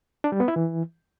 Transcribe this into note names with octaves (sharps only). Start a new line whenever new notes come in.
D4
G3
B3
E4
E3